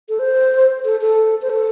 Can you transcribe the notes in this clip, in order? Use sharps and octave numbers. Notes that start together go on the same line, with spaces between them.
A4
C5
A4
A4
C5
A4